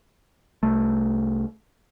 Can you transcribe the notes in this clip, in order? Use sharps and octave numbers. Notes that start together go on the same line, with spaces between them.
C2 A3